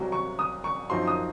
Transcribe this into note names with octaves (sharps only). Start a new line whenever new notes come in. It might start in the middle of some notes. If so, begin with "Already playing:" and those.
Already playing: C2 C3 F#3
C#6
D#6
C#6
F#2 F3 C4 D#4 C6
D#6